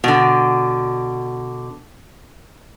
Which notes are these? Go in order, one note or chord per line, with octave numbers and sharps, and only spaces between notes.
B2 D3